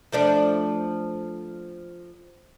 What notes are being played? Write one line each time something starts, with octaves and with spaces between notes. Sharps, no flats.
F3 A3 D4